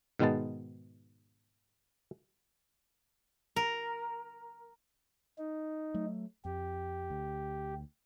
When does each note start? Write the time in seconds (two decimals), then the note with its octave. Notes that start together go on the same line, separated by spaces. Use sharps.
0.19 G#2 B2 D#3 G#3 B3 A5
3.56 A#4
5.38 D#4
5.94 F#3 A3
6.45 F2 G4
7.10 D2